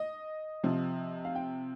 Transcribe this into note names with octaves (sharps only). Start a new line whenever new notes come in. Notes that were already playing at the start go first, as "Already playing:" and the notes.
Already playing: D#5
C3 F3
F5
G5